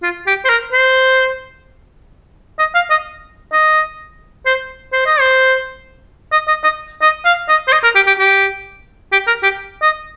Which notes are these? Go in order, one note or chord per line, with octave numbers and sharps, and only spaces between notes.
F4
G4
C5
A#4
C5
D#5
F5
D#5
D#5
C5
C5
D#5
C5
D#5
D#5
D#5
D#5
F5
D#5
C5
D#5
A#4
G4
G4
G4
G4
A#4
G4
D#5